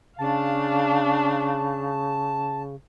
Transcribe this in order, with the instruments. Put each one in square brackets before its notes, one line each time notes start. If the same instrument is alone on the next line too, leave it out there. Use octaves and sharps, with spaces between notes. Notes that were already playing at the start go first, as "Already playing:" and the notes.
[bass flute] C#3 [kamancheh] D4 F5 [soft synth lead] A5